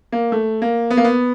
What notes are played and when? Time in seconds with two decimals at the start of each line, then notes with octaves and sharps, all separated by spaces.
0.12 A#3
0.32 A3
0.62 A#3
0.90 B3
0.97 A#3
1.04 B3